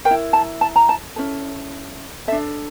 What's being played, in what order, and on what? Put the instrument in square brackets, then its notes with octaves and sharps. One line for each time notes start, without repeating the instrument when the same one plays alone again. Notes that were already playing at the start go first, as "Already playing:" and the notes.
[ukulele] A#4 G5
E4
A5
A5
A#5
A5
C#4 E4 A4
A4 E5
D4